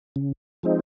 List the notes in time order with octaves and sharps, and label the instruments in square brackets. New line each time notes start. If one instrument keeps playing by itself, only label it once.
[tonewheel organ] C#3
F3 G#3 C4 D#4